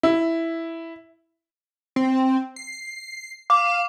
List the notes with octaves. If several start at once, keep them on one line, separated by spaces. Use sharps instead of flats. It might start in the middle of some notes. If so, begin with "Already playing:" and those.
E4
C4
C7
F5 D6